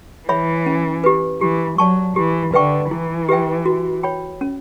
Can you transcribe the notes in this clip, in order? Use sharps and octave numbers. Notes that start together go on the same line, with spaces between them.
E3 C#5 E5 B5
C#4
G4 B4
E3 G4
F#3 D5 A5 C#6
E3 G4
D3 B4 E5 G5 C#6
E3 E4
G4 B4 E5 G5
F#4
C#5 G5 B5
C#4